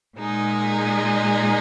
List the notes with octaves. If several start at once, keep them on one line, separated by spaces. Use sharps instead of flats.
A#2 G#3 D#4 G#4